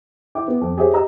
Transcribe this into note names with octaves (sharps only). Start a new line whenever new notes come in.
E4 E5 G5 D6
B3
F2
G4 G#4 C5 C#5 E5
G4 D#5 A#5 E6